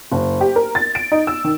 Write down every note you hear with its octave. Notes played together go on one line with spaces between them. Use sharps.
F#1
G4
A#4
A6
D7
D#4
E6
D#3